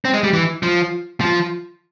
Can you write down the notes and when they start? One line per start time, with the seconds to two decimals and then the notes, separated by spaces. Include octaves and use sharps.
0.05 C4
0.14 G#3
0.24 G3
0.33 E3
0.63 F3
1.21 F3